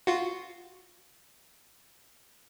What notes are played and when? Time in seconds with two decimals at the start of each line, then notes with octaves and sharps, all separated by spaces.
0.07 F4 F#4